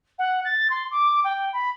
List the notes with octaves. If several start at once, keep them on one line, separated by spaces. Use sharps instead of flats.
F#5
A6
C6
D6
G5
B5